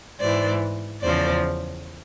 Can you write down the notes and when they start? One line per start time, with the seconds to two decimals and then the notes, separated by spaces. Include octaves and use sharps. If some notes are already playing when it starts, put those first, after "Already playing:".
0.20 G#2 E3 C5 D5
1.02 E2 C#3 F3 C5 D5